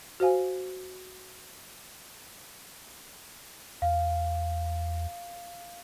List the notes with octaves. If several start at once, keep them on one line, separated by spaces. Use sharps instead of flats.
F#4 C5 F5 G#5
E2 F5